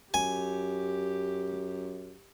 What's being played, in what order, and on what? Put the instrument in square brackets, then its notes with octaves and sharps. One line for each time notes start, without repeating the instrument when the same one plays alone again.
[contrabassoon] F#2 [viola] G4 [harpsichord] G#5